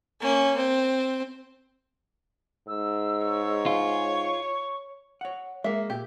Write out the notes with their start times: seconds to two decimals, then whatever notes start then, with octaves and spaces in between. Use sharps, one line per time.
0.20 A#3 C#4
0.57 C4
2.68 G#2 E6
3.25 C#5
3.66 F4 G#5
4.14 C#6
5.21 C#5 F#5
5.64 G#3 A#3 E5
5.90 A#2 G4